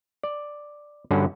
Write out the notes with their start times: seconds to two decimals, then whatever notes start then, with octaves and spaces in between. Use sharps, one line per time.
0.23 D5
1.11 G2 D3 C#4 F#4